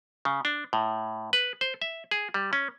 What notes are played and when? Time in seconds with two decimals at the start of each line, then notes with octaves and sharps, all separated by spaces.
0.25 C#3
0.45 D4
0.73 A2
1.33 B4
1.61 C5
1.82 E5
2.11 G#4
2.34 G3
2.53 C#4